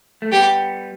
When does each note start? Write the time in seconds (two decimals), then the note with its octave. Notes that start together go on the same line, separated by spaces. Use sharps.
0.22 A3
0.32 G3 B3 G4